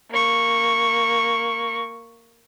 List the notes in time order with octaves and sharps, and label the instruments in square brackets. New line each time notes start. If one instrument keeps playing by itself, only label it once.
[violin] A#3 C#6